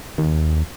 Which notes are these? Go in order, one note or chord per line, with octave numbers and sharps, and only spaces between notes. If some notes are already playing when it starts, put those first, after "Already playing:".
D#2